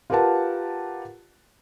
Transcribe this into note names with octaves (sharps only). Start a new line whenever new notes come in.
F4 G4 A#4 B4 F#5 A5